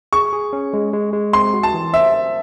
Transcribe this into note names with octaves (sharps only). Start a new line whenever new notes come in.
G#4 C#6
G#4
C#4
G#3
G#3
G#3
C4 C6
F#4
A5
E3
C5 E5
C5